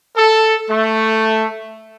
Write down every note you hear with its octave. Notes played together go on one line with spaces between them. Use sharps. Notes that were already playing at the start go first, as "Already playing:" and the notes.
A4
A3